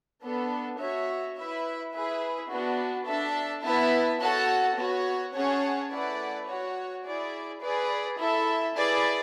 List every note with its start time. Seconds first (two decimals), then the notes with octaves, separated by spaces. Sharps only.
0.22 B3 D4 A4
0.79 F#4 C#5 E5
1.36 E4 B4 E5
1.93 E4 G#4 B4 E5
2.49 B3 D4 F#4
3.07 D4 A4 E5 A5
3.63 B3 E4 B4 E5 A5
4.20 F#4 A4 C#5 F#5 A5
4.77 B3 F#4 C#5
5.34 C#4 G#4 C#5 F#5 A5
5.91 A3 E4 B4 D5 F#5
6.48 F#4 C#5 F#5
7.05 E4 G#4 D5
7.62 G#4 B4 D5
8.18 E4 A4 E5
8.76 E4 G#4 B4 D5